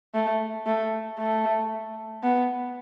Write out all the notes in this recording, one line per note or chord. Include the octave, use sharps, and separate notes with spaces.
A3
A3
A3
B3